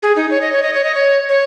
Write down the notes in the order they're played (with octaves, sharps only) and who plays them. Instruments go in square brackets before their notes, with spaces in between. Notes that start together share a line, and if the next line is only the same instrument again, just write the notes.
[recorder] G#4
D#4
C#5
D#5
C#5
D#5
C#5
D#5
C#5
C#5